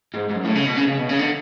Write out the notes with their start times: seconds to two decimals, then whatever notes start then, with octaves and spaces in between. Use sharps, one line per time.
0.14 G#2
0.30 G#2
0.36 F#2
0.45 A2
0.55 C#3
0.66 B2
0.77 C#3
0.87 C#3
0.98 B2
1.09 C#3
1.19 D3